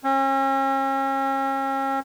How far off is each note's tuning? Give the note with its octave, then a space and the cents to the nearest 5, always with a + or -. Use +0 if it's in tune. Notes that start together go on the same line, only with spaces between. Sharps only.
C#4 -40